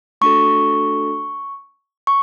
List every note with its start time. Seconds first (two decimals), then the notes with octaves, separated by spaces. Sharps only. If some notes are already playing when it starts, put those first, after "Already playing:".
0.21 A3 D4 F#4 A4 C#6
2.07 C#6